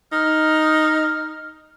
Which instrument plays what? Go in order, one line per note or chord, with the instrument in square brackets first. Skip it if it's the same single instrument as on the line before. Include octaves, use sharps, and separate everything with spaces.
[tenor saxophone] D#4 [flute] F6